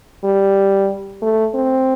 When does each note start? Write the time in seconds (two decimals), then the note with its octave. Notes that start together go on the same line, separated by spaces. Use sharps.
0.24 G3
1.22 A3
1.55 C4